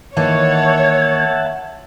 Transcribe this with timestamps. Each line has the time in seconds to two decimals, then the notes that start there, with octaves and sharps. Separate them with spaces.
0.17 D#3 E3 A#3 C#5 E5 F#5 A5 G#6